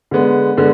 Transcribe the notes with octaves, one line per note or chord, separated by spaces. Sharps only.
D3 G#3 B3
D3 G#3 B3